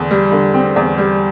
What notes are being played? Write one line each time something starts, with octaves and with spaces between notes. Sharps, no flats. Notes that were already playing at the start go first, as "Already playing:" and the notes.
Already playing: E2 D3
G3
D3
C4
E2
G3